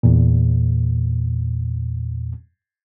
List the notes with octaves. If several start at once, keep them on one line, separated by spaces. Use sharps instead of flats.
E2 A#2